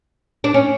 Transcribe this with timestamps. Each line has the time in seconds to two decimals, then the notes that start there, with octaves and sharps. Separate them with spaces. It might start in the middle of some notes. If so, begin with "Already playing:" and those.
0.44 D4
0.54 C#4